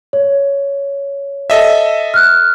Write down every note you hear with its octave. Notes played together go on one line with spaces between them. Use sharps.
C#5
A4 D#5 E5
F6 F#6